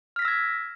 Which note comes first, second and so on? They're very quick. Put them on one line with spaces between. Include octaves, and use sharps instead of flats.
F6 B6 A#6 E6 G#6